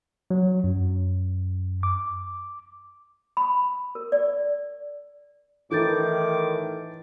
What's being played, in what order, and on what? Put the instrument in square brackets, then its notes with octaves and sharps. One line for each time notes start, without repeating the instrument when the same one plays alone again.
[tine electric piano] F#3
F#2
D6
[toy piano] B5
A#4
D5
[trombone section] A2 D#3 [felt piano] E3 [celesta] A4 G6 A6 [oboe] D6